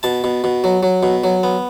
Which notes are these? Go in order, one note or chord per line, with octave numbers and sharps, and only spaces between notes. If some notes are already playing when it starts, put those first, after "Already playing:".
B2 A5
B2
B2
F#3
F#3
B2
F#3
B3